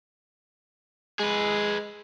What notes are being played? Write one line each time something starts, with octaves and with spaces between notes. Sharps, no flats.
G#3 G#4 B4